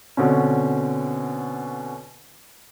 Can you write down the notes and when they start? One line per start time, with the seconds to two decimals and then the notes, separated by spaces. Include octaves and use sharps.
0.17 B2 D3 C4 C#4